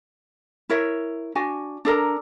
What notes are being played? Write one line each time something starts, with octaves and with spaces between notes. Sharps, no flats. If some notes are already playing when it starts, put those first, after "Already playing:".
E4 A#4 C#5 E5
D4 F#4 G#5
D4 A4 A#4 A#5